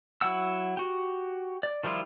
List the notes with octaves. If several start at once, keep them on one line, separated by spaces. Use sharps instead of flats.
F#3 E4 F#5 E6
F#4 G4
D5
D#3 F3 G3 E4 F4